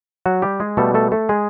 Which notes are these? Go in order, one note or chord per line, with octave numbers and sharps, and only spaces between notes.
F#3 F#4
G3 G4
G#3 G#4
B2 G3 A3 A4
A3 A4
A3 A4
G#3 G#4